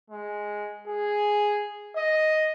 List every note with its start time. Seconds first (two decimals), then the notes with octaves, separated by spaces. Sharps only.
0.10 G#3
0.88 G#4
1.96 D#5